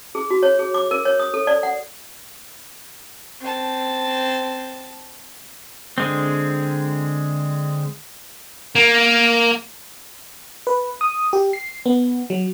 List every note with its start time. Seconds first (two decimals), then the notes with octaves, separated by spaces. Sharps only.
0.15 G#4
0.31 F#4
0.43 C#5
0.59 G#4
0.74 D6
0.91 A#4
1.05 C#5
1.20 D#6
1.34 A4
1.47 D5
1.63 F#5
3.41 C4 A5
5.98 D3 G#3 C4
8.75 A#3
10.67 B4
11.01 D#6
11.33 G4
11.53 C7
11.86 B3
12.30 F#3